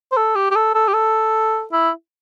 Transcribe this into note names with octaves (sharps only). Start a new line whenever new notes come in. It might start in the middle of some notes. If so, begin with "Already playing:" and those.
C5
A4
G4
G4
A4
A4
G4
A4
E4